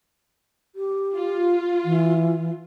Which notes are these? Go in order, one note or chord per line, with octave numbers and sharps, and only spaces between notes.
G4
F4
E3